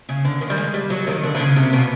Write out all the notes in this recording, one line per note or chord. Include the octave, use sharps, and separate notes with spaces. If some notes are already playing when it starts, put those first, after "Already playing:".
C#3
D3
D#3
G3
G#3
G3
F#3
D#3
D3
D3
C#3
C3
B2